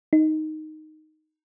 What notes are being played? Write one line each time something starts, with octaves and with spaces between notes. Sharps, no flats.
D#4